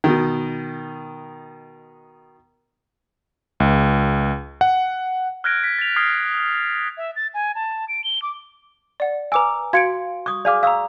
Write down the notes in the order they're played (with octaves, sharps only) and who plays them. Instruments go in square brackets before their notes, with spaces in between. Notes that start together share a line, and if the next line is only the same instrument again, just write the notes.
[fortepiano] B2 D#3
[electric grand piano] C#2
F#5
[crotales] F6 F#6 G#6 A#6 D7
B6
A6 F7
D#6 F6 G#6 C7
[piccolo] E5
A6
G#5
A5
D7
G7
D6
[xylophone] D5 F#5
[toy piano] B4 G#5 [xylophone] A#5 D6 E6
[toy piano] F#4 F5 C6 [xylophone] G#6 C#7 D7
[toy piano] C#6 D#6
[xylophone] G#4 G#5 F6 [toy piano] D5 F5 D6
[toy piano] F5 E6 [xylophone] A#5 C#6 D#6